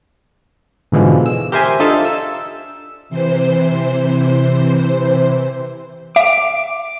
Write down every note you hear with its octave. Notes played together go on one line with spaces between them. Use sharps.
G#2 B2 D3 E3 F3 G#3
E6
G4 A#4 C5 E5 G#5
D4 D#4 F4 A4 E5
E6
C3 E3 C5
E5 D6